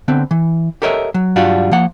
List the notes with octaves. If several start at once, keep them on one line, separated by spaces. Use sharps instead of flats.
D3 B3 C4
E3
G4 A4 A#4 C#5 D#5 E5
F#3
G2 F#3 G3 D4 F4 F#4
F3 A#3 F#5